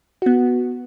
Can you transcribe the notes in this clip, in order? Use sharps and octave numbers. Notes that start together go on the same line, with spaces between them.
B3 F#4